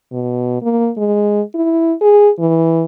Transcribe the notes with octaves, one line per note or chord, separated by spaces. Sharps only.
B2
A#3
G#3
E4
G#4
E3